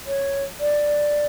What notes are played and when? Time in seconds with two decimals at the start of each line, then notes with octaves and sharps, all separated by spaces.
0.06 C#5
0.60 D5